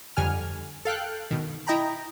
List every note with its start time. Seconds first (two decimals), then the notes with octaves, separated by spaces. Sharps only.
0.17 F2 D3 G3 G#5 F6
0.85 A4 F5 G5 F#6
1.31 B2 D#3
1.67 E4 D#5 G5 A#5 B5